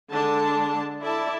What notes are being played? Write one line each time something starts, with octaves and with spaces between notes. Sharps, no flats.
D3 G#3 D4 A5
E4 A4 D5 E5 A5